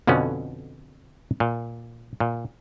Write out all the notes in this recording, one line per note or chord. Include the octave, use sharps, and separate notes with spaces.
F2 B2 D3 B3 C#4
A#2
A#2